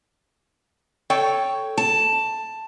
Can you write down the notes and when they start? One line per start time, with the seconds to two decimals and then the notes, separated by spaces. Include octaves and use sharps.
1.10 A4 C#5 G5
1.78 A5